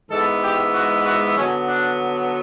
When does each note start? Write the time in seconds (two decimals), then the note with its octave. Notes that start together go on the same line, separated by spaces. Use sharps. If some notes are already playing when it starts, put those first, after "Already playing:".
0.11 G#2 E3 G#3 B3 A4
0.43 G4
0.74 F#4
1.06 F#4
1.36 D3 F#3 B3 C#4
1.68 D4